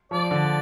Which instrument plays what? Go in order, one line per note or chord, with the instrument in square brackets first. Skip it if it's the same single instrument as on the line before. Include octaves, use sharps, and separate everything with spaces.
[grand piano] F3 [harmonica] D5
[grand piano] D3